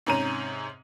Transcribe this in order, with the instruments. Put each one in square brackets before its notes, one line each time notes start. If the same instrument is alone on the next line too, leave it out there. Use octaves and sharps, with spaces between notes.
[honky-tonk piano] G#2 C3 C#4 A#5 D#7